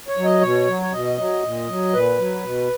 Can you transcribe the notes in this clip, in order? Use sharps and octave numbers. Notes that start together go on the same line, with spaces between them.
C#5
F#3
D#5
B2 C#5
F#3
C#5
B2 D#5
F#3
A#2
F#3
A#2 B4
F#3
B2